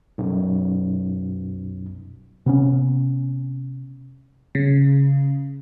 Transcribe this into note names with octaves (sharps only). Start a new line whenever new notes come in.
B1 F#2
C3 B3 C#4
C#3